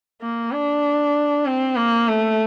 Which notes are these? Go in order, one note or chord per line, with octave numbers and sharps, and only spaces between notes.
A#3
D4
C4
A#3
A3